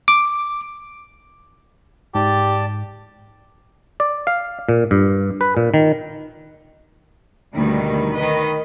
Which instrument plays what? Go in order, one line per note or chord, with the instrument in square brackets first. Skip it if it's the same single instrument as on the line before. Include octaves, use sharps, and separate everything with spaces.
[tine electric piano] D6
[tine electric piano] G#2 [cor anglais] G4 [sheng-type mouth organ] D5 A5
[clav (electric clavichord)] D5
F5
A#2
G2
B4
A#2
D#3
[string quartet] D2 [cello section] B2 D#3 G3
[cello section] D#3 B4 [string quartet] D#5